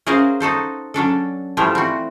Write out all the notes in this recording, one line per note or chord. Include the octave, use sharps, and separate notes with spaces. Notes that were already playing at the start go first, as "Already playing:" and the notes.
C#4 F#4 G#4 A#4 C5 F5
D#4 F#4 A4 C5
F#3 C#4 D4 A4
E3 F3 G3 A3 E4 F4
C4 F#4